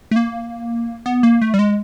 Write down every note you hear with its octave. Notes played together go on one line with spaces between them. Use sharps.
A3
A#3
B3
A#3
A3
G3
G#3